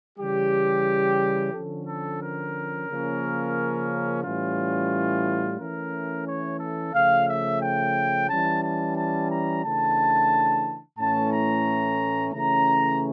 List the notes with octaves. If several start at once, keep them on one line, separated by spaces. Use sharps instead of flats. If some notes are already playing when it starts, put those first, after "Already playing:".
C#3 E3 G3 G4
D3 F3 C#4 A4
A4
A#4
C#3 F3 A#3 C#4
A2 E3 G3 C#4 F4
E3 A3 C#4 A#4
C#5
A4
C#3 F3 A3 F5
E5
G5
E3 G3 C#4 A5
A5
A5
A#5
C#3 E3 A3 D4 A5
A2 E3 A3 C#4 A5
A#5
C#3 E3 A3 C#4 A#5